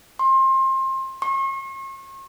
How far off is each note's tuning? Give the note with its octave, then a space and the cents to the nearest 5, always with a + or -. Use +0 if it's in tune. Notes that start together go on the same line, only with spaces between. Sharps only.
C6 +25
C#6 -40